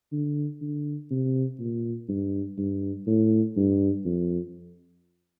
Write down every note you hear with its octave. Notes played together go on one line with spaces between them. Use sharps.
D3
D3
C3
A#2
G2
G2
A2
G2
F2